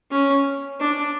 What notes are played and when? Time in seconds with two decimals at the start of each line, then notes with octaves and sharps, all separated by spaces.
0.11 C#4
0.80 D4